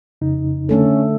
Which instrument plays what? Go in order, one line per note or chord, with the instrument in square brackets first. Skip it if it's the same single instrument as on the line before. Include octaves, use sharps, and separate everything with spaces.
[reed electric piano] F2 C#3 D#4
[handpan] D3 A3 A4 [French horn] C#4